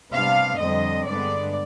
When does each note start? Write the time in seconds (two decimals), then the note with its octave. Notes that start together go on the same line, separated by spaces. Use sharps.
0.12 C3 G3 B3 D4 F5
0.59 F2 D3 G3 C4 D#5
1.06 G2 D3 G#3 B3 D5